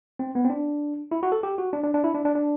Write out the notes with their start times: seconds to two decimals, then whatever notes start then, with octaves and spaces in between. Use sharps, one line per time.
0.19 C4
0.35 B3
0.45 C4
0.50 D4
1.11 E4
1.23 F#4
1.32 A4
1.43 G4
1.58 F#4
1.73 D4
1.84 D4
1.94 D4
2.04 E4
2.14 D4
2.25 D4
2.35 D4